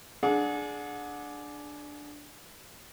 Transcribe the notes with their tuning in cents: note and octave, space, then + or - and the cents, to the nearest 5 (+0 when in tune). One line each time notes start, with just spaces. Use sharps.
D4 +0 G#4 +25 F#5 -30